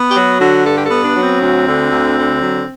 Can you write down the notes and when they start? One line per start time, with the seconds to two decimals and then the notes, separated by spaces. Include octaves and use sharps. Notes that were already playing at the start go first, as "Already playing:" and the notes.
Already playing: B3
0.10 G4
0.15 F#3 F#4
0.40 D3 F#4
0.65 G2 A4
0.76 G4
0.85 A4
0.91 B3
1.04 D4
1.16 F#3
1.22 C4
1.41 D2
1.66 D3
1.91 D2
2.17 D3
2.42 F#3